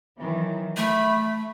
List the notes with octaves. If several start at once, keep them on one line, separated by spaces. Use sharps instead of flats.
D#3 E3 F#3
A3 B5